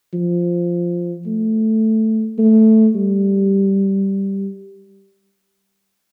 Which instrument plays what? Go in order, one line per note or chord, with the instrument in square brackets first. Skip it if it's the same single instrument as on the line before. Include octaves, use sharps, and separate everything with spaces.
[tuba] F3
A3
A3
G3